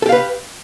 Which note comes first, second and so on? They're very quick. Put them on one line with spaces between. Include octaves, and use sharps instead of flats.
A4 G4 F5 B4